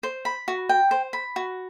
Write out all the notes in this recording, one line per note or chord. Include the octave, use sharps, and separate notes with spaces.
C5
B5
F#4
G5
C5
B5
F#4